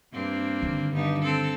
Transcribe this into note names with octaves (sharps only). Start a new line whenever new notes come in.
G2 A#3 C4
D3 D#3
G2 B3 D#4
C4 A4